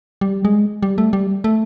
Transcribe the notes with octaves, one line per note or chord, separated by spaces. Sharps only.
G3
G#3
G3
A3
G3
A3